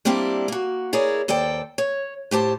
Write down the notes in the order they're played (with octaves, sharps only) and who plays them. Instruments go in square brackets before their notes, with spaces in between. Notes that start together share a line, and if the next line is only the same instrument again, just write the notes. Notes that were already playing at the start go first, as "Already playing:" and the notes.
[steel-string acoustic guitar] G3 A#3 C4 D4 E4 G4
A#3 F#4
E4 G#4 A#4 C#5 D5
D#2 A4 C5 D5 G5
C#5
A2 G4 C5 A5